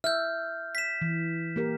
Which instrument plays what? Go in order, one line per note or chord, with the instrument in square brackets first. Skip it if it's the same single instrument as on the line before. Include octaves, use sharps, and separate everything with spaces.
[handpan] E5 [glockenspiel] F6 G6
[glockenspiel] B6 E7
[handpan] E3
A#3 G4 A#4